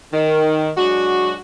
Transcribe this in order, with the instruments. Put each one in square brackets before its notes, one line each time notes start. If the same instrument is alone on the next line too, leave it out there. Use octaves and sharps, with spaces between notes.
[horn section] D#3
F#3 G#3 D4 F#4